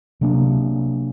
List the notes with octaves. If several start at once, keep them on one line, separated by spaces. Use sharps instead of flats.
C3 F#3 A#3 D4